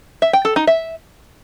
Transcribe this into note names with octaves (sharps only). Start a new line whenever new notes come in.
E5
G5
A4
D#4
E5